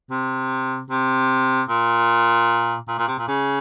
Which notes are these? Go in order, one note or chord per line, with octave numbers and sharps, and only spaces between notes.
C3
C3
A#2
A#2
A#2
C3
A#2
C#3